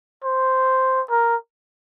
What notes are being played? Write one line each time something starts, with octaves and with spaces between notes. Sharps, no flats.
C5
A#4